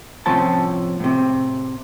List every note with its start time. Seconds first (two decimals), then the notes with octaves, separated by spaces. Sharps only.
0.26 A2 C3 F3 C#4 C5 A5
1.00 A2 C3